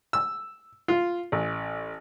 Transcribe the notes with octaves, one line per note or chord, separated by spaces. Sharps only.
E6
F4
A1